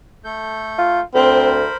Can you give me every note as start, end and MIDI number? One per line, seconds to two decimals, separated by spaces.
0.24 1.00 57
0.24 1.00 69
0.24 1.00 91
0.78 1.02 65
1.15 1.68 38
1.15 1.58 60
1.15 1.77 70
1.15 1.77 72
1.15 1.77 83